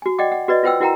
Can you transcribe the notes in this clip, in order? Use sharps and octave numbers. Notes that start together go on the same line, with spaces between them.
F#4 G#5
D5 D#5 F#5 G5 D6
F#5
F#4 B4 D5 D#5
F4 B4 C5 F#5 G5 E6
E4 F#4 A#4 F#5 G5 A#5